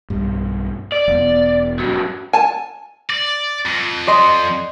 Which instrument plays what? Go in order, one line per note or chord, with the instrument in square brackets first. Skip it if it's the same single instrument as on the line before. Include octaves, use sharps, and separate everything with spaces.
[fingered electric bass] B1 G2
[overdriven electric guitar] D5
[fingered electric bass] E1 B3
[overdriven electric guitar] G2 F#3
[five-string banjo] G#5 A5
[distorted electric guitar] D5
F2
[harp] D5 D#5 C6